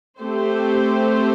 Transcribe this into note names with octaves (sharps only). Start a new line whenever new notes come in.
A3 C4 G4 C5